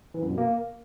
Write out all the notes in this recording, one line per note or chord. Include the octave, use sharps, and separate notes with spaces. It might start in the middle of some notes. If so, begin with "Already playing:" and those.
E3
F#2
B2
A#3